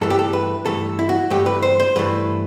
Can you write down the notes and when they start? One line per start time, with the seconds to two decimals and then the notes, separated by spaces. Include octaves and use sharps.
0.01 G2 E3 A3 A4
0.10 G4
0.19 A4
0.33 B4
0.66 G2 E3 A3 A4
0.99 E4
1.09 F#4
1.30 G2 E3 A3 G4
1.46 B4
1.62 C5
1.80 C5
1.96 G2 E3 A3 B4